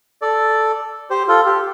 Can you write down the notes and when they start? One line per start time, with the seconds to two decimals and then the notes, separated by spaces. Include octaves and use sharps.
0.22 A4 D5
1.10 G4 C5
1.28 F4 A4
1.46 G4